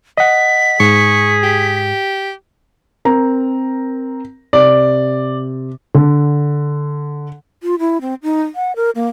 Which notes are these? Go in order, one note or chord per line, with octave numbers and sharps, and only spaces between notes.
D#5 F#5 B6
G#2 G#4 C#6
G4
C4 A#4 A#5
C3 D5
D3
F4
E4
C4
D#4
F#5
A#4
A#3